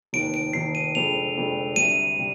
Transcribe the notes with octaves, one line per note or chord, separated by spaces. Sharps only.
F1 D#2 D#3 D7
D7
F1 D#2 D#3 C7
D#7
F1 F2 D3 G#3 F7
F1 F2 D3 G#3
D2 C3 G3 D4 D#7
C3 G3